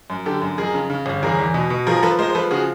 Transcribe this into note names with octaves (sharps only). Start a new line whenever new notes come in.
F#2
D3 G4 A4
F#2
F2 G#4 A#4
C#3
C#3
G1
E2 G#4 A#4
E2
B2
B2
F3 G#4 A#4
A#4
F3 A4 B4
G#3 A#4 C5
C5
F3 A4 B4
C#3 F#4 G#4